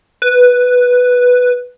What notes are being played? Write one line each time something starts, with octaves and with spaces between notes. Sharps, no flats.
B4